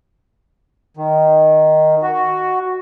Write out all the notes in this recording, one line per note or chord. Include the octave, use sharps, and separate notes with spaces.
D#3
F#4